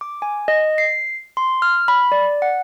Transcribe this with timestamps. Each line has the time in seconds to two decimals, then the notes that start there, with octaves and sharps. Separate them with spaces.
0.01 D6
0.22 G#5
0.48 D#5
0.78 C7
1.37 C6
1.62 F6
1.88 B5
2.12 D5
2.42 F#5